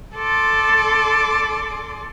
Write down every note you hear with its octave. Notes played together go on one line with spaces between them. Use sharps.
A4 D5 C6 D6